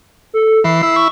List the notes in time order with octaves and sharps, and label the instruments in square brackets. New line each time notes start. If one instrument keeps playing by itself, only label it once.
[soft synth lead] A4
[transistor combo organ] E3 [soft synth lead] C7
[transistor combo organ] E4
[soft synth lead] C#6